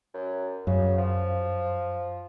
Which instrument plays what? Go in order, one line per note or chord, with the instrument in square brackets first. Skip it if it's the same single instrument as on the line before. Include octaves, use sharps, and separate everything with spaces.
[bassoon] F#2
[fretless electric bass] F#2 [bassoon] C#3
[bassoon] F3